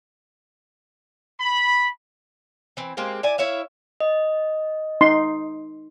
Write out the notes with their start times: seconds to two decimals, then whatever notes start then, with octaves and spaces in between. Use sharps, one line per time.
1.40 B5
2.77 E3 C4
2.97 G#3 A#3 C4 G4
3.23 E4 D5 G#5
3.38 E4 C#5 E5 F5
4.00 D#5
5.01 D#4 C6